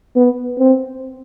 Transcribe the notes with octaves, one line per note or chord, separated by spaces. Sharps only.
B3
C4